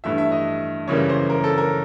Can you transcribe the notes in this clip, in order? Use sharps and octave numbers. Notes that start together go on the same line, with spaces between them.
G2 E3 A3 E5
E5
D#5
F#2 C#3 E3 G3 A#3 C#5
C5
A#4
A4
A#4